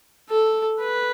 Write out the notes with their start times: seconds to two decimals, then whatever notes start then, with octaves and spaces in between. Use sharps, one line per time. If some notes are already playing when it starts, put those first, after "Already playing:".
0.30 A4
0.79 B4